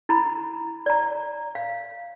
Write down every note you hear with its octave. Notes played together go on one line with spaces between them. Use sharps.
E4 A#5 B5
D5 A#5
F5